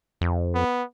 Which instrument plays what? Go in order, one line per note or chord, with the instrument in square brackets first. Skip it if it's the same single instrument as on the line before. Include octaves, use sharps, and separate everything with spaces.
[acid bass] F2
[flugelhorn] B3